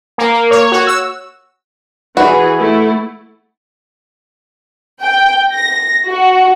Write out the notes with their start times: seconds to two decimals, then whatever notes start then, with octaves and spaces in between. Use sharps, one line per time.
0.18 A#3
0.33 A#3
0.51 C#5
0.72 F#4
0.87 E6
2.17 E3 F#4 G#4 F#5 B5
2.59 A3 E4
5.01 G5
5.53 A#6
6.06 F#4